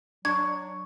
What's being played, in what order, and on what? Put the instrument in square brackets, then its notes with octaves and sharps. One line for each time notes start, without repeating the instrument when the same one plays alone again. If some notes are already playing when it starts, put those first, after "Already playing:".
[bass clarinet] F#3 [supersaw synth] D4 [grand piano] C#6 [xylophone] G#6